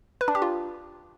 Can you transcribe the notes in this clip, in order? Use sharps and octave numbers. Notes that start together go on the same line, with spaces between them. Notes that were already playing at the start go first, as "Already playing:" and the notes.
B4
D4
G4
F4